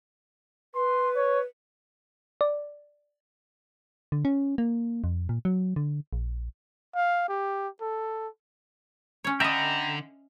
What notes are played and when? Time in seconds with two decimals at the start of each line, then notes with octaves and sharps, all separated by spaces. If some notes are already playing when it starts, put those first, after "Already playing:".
0.75 B4 C6
1.16 C#5
2.41 D5
4.12 D3
4.25 C#4
4.58 A#3
5.04 F2
5.29 A#2
5.45 F#3
5.76 D3
6.13 A#1
6.95 F5
7.29 G4
7.81 A4
9.24 C#4 C#5
9.40 D3 D#5 E5 G5 A#5 B5